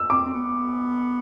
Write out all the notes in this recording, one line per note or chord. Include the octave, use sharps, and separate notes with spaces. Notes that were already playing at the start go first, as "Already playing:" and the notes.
Already playing: E6
C4 D6
C4
B3